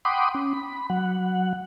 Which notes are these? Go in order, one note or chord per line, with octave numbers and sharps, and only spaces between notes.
F#5 G5 B5 C6 D6 D#6
C#4
B5
F#3 F#5